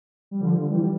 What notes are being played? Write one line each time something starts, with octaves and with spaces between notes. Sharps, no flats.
G3
D3 F3
E3 G3
G3